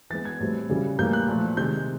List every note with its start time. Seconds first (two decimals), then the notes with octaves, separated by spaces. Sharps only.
0.10 E3 G#3 B3 A6
0.25 G#6
0.40 A2 E3 G3 C4
0.69 C#3 E3 G3
0.99 A2 E3 G3 A#3 G6
1.13 F#6
1.28 A#2 F3 A3
1.57 C3 D#3 G#3 G6